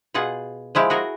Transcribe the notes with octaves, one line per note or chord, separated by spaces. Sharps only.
B2 F4 G#4 F#5
F3 G#3 E4 G4
F#4 G#4 A#4